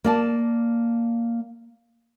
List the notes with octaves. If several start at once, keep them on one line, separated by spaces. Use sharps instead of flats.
A#3 D5 A5